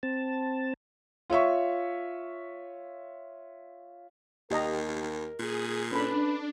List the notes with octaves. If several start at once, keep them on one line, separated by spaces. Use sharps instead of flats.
C4 A5
F4 C#5 E5 C#6
D#2 G4 A#4 D#5 A#5
A#2 G#4
C#4 D4 A4 B4 B5